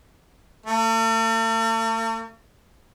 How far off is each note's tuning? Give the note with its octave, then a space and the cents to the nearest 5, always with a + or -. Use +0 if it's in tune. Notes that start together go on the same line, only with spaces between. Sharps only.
A3 +45